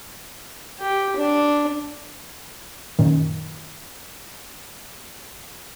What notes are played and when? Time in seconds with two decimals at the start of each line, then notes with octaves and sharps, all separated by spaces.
0.79 G4
1.16 D4
2.99 F#2 A#2 D#3